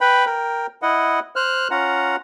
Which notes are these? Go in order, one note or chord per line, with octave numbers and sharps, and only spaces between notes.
B4 G5 B5
A#4 G5
E4 D#5 F#5
C5 F6 F#6
C#4 F4 F#5 A#5